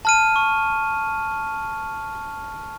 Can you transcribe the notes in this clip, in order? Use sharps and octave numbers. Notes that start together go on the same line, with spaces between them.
A5 F6 D#7
C#6